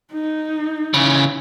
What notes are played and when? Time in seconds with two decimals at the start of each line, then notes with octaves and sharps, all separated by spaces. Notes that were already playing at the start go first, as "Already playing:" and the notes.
0.13 D#4
0.94 C#3 E3